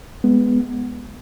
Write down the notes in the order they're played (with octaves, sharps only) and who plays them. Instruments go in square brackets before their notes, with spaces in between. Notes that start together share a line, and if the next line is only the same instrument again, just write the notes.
[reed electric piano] G#3 B3